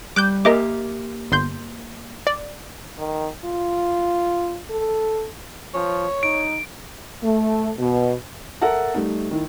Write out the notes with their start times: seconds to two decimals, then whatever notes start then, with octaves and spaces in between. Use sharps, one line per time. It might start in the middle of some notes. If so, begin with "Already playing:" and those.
0.16 G3 D6 F#6 G6
0.45 A#3 G4 A#4 D#5 E5 D6
1.32 G1 C6 G6
2.27 D5
2.99 D#3
3.45 F4
4.70 A4
5.74 F3 C#5
6.23 D#4 D7
7.23 A3
7.79 B2
8.61 A4 A#4 E5 F#5 A5
8.94 G3 A3 D#4
9.31 D#3 E4